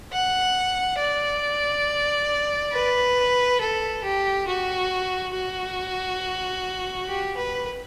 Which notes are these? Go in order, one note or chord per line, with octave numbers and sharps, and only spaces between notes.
F#5
D5
B4
A4
G4
F#4
F#4
G4
B4